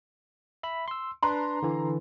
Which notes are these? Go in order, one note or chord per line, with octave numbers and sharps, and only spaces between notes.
E5 B5
C6 E6
D4 B4 A#5 C6
D3 E3